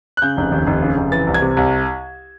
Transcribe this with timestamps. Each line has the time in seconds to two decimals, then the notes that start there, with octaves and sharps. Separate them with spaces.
0.17 F#6
0.22 C#3 G6
0.37 F1
0.52 D#2
0.67 F1
0.82 C#3
0.97 F1
1.12 E3 A6
1.27 C2
1.34 G#6
1.42 C3
1.57 C2